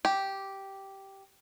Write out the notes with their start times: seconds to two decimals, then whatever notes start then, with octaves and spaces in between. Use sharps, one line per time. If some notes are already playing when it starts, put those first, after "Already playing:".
0.05 G4